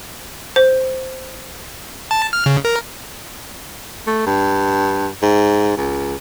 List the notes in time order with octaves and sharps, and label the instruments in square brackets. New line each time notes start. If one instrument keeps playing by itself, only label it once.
[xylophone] C5
[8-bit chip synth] A5
F6
C#3
A#4
[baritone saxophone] A3
G2
G#2
C#2